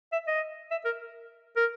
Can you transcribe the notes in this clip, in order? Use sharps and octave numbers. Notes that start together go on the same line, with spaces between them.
E5
D#5
E5
A#4
A#4